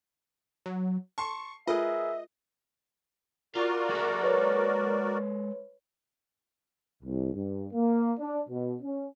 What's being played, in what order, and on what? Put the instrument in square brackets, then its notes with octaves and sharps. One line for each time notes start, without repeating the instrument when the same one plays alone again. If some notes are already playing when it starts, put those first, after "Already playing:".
[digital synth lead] F#3
[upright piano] A5 C6 C7 [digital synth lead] C#6
[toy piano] F4 E6 [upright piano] G#4 A#4 B4 [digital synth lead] D#5 [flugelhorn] E5
[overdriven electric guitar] F4 F5 [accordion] F#4 A#4 D5
[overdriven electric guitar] G#3 A4
[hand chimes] B4 C#5
[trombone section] C2
G2
A#3
D4
B2
C#4